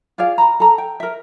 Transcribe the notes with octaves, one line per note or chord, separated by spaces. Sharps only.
F4 G#4 D5 F5
A#5 B5
A4 A#5
G5
A#4 E5